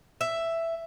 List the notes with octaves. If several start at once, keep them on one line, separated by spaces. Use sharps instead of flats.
E5